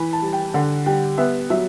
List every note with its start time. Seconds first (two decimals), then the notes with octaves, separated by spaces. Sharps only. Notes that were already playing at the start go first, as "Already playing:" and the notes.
Already playing: E3 B5
0.13 A5
0.22 G3
0.33 G5
0.54 D3 F#5
0.86 G3 G5
1.18 B3 E5
1.50 F#3 E5